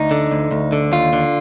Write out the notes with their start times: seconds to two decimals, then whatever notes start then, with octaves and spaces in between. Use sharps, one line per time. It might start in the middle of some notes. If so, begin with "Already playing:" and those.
Already playing: D2 D#4
0.11 D3
0.32 D2
0.51 D2
0.72 D3
0.92 D#2 F4
1.13 D3